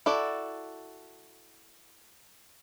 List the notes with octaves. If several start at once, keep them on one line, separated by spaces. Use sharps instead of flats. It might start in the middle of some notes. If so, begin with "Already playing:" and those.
E4 F#4 A4 D5